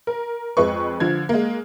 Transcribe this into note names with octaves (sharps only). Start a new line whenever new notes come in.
A#4
F2 G#3 B4 C#6
D3 F3 G#6
G#3 A#3